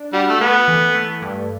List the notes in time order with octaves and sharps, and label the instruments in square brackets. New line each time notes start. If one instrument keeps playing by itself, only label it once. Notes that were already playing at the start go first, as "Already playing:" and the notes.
Already playing: [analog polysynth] D4
[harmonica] G3 [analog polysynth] F#4
[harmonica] A3
[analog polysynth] A3 [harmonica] B3
[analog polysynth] E3
A3
G2